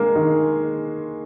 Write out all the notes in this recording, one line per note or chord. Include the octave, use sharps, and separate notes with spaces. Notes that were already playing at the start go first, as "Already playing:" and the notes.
Already playing: G#3 A#3
D#3